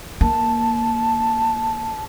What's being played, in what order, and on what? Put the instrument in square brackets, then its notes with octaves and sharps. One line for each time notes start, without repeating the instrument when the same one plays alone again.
[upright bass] A#3 [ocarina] A5